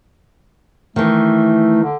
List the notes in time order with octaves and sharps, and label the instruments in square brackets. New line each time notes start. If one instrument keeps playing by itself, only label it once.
[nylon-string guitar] D#3 E3 [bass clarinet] A3
[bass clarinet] D3